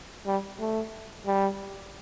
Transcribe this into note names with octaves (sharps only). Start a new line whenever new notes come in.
G3
A3
G3